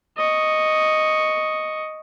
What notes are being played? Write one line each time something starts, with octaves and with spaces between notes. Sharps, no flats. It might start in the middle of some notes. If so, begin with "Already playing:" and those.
D#5 C#6